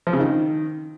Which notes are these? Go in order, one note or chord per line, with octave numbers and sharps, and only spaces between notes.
F3
C#3
D#3